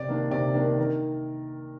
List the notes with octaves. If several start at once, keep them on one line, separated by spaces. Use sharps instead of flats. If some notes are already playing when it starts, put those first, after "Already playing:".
Already playing: C3 D5
D#3 A#3 D4
C3 D5
D#3 A#3 D4
D#3 A#4